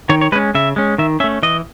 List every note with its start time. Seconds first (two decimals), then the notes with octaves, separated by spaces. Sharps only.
0.09 D#3 C#5
0.21 C#5
0.32 G#3 B4
0.36 C#4
0.55 C#3 E5
0.76 G#3 C#4
0.98 D#3 E5
1.20 C#4 E5
1.24 A3
1.43 E3 D#5